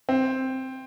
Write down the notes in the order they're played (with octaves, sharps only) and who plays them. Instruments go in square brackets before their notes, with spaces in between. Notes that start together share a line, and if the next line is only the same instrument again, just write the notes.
[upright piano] C4